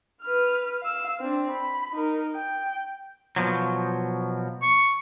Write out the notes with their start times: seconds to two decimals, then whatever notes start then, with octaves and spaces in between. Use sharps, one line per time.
0.22 B4 F6
0.82 F5 E6
1.20 C4 D4
1.51 B5
1.94 D#4 A#4
2.35 G5
3.36 B2 F3 F#3
4.62 C#6